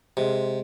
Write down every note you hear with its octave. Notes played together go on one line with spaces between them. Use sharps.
C3 G#3